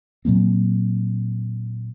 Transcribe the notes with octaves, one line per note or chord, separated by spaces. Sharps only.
A#2 F#3 A#3 C4